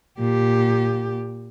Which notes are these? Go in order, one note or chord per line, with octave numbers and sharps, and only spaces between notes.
A#2 G4